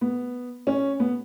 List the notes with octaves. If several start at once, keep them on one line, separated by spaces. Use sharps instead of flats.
B3
C#4
B3